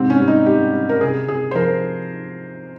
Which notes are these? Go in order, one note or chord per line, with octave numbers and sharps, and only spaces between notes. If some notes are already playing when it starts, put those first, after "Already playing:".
Already playing: G#2 C3 C4
C#4
G3
D#4
G3 G4
G3
A#4
C3 G#4
C3 G#4
C5
F3 A#4